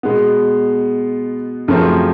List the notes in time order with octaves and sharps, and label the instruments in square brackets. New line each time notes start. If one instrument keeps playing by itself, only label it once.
[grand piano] B2 G#3 B3
F#2 C#3 F3 A3 C4